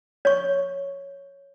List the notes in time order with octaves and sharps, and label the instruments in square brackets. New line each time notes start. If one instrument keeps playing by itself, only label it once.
[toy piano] C#5 C#6